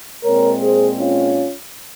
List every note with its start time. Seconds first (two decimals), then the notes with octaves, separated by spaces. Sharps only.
0.24 A#2 G#3 C4 A#4 C#5
0.61 G#4 C5
0.99 C#4 F4